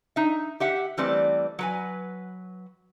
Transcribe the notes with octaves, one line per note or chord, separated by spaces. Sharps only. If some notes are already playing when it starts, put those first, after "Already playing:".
D#4 E5
G4 E5 F#5
E3 G3 A3 C4 B4 D5
F#3 B4 G#5